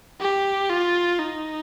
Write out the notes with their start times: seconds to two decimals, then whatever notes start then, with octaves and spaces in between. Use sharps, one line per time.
0.21 G4
0.69 F4
1.19 D#4